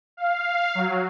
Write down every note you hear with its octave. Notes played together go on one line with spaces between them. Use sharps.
F5
F#3